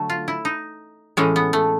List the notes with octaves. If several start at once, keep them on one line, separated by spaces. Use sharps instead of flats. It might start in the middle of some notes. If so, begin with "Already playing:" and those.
Already playing: D3 F#3 A3
F4
E4
D#4
A2 E3 G#3 C#4
B3
A3